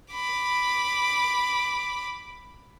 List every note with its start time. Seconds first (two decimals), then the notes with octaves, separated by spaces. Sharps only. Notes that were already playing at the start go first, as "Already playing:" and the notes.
0.13 B5 D6